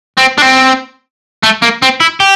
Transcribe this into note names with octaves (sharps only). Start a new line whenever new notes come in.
C4
D4
C4
A3
A#3
C4
E4
G4